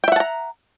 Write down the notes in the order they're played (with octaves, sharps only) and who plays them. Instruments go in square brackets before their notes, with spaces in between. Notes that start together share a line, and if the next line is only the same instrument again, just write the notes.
[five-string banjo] G5
E5
F#5
A5
A#5